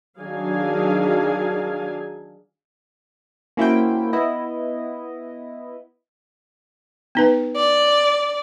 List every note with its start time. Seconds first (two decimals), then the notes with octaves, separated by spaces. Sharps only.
0.18 D#3 F#3 D4 G#4 F5 G#5
3.57 A#3 C#4 E4 F#4 C5 G5
4.13 B3 E4 D#5
7.15 B3 D#4 B4
7.56 D5